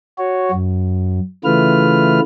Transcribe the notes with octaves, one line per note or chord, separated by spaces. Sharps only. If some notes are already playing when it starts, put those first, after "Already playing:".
F#4 C#5
F#2
C#3 E3 A3 F4 B4 F6